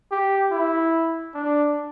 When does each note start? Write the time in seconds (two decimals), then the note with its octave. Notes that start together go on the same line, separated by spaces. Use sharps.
0.11 G4
0.52 E4
1.34 D4